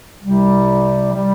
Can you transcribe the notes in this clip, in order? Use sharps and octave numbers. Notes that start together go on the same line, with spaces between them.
C2 C3 G3
C3 G3